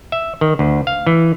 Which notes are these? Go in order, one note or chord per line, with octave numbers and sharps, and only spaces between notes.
E5
D#3
D2
F5
E3